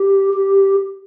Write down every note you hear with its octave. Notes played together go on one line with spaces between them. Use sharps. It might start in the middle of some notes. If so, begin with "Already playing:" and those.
Already playing: G4
G4